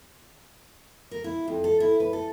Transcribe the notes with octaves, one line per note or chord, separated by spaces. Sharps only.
A#4
E4
F2
A4
E4
B4
A4